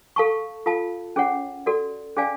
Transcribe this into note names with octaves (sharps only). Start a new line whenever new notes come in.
A4 F5 A5 C#6
F4 A4 F5 A5
C#4 G#4 C#5 F#5
F#4 A4 D5
C#4 G#4 D5 F5 G#5